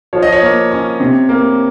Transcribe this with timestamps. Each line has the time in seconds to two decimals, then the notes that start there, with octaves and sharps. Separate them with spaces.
0.13 F3 C#5
0.22 D#5
0.32 C#5
0.42 A#3
0.71 C#4
1.00 C3
1.29 A#3